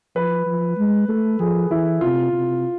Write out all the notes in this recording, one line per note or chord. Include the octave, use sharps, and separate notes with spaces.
F3 B4
F3
G#3
A3 A4
F3 G#4
E3 E4
C3 F4
C3